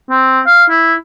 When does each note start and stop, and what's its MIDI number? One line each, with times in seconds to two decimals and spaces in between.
0.10 0.40 60
0.46 0.65 77
0.70 0.94 64